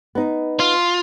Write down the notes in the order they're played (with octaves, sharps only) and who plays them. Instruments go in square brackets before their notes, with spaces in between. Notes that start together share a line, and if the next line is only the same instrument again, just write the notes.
[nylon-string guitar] B3 D#4
[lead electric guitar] F4